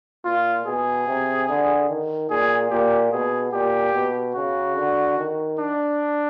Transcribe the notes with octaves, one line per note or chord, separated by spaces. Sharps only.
A#2 F4
B2 G#4
C3
D3
D#3
A#2 G#4
A#2 G4
B2 G#4
A#2 G4
B2
C#3 F#4
D3
D#3
D4